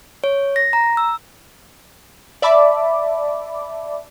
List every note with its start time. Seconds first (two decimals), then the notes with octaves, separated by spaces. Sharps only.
0.24 C#5
0.56 A#6
0.73 A#5
0.97 E6
2.42 D5 E5 A5 B5 D6